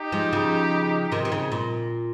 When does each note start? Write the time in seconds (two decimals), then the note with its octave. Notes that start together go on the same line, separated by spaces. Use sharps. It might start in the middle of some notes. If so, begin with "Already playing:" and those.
Already playing: D#4 G4
0.12 F3 G#3
0.32 C#3 F3
1.12 C3 D#3 C4 D#4
1.25 D#3
1.32 C#3
1.52 A#2